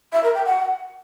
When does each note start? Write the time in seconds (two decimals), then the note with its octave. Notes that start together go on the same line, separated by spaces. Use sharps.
0.13 E5
0.24 A#4
0.34 G5
0.45 F#5